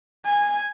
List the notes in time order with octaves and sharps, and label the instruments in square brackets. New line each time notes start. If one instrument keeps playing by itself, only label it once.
[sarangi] G#5